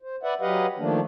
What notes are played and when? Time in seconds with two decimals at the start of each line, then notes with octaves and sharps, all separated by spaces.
0.02 C5
0.23 B4 D5 E5 F#5
0.41 F#3 G4 B4 D#5 F5 F#5
0.78 D#3 F3 A3 A#3 D4